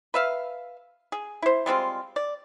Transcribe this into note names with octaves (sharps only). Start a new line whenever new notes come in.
B4 E5 F5
G#4
E4 C5
G3 G#3 C4 F4
D5